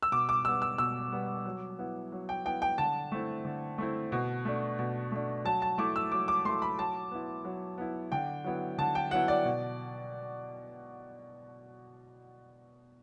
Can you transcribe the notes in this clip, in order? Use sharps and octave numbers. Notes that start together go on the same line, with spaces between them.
E6
B2 D6
D6
G3 B3 E6
E6
B2 E6
G3 B3
F#3
B3 E4
F#3
G5
B3 E4 G5
G5
D3 A5
A3 C4 E4
D3
A3 C4 E4
B2
A3 D4
B2
A3 D4
F#3 A5
A5
A3 E4 D6
E6
F#3 D6
D6
A3 E4 C6
B5
F#3 A5
B3 E4
F#3
B3 E4
D3 G5
F#3 B3 E4
D3 A5
G5
F#3 B3 E4 F#5
D5
B2